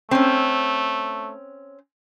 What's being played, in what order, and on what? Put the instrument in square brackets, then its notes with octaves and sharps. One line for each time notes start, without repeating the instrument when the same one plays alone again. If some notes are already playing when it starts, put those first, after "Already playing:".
[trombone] A3 [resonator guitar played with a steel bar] C4 C#4